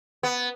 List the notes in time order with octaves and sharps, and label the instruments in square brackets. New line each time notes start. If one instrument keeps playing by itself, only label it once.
[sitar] B3